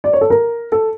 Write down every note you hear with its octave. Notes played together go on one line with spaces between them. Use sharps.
D5
C#5
A4
A#4
A4